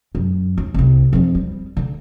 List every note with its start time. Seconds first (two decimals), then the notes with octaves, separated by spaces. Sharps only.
0.15 F#2
0.58 D#2
0.74 C2 C4
1.13 F2 F3
1.35 G3
1.77 D3